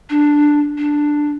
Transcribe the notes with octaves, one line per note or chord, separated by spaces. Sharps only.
D4
D4